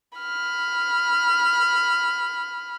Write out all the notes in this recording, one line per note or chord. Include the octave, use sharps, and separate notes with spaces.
B5 F6